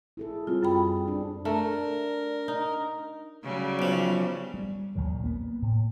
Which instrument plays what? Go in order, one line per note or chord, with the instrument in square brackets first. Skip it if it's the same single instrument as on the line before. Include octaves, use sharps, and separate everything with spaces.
[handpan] E4 G#4 A4
[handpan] G3 C4 G#4 [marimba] F4
[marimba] F#2 G5 B5
[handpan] D4
[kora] A3 [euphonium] D4 [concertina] A#4
[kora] D#4
[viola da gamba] C#3 F#3 G3
[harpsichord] B1 F3
[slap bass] G3
A#1 D#2 D#3 F#3
A#3 B3
A2